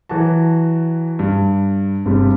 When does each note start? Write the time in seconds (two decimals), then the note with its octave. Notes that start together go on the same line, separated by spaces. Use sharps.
0.09 E3 F#3 F#4 A5
1.19 G2
2.05 G1 G2 C3 G3 G#3